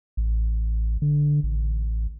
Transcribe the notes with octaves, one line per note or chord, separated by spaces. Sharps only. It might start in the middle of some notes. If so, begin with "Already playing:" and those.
A1
D3
A1